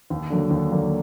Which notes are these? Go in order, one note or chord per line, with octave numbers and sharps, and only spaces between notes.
D#2
D3 F#3 A#3
D#2
D3 F#3 A#3